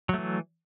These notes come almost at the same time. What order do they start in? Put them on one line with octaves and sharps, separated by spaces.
F#3 A3 E3